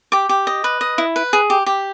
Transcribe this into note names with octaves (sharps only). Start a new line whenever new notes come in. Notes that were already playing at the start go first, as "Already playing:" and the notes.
G4 D6
G4
D#5
B4
D#5
E4
B4
G#4
G4
G4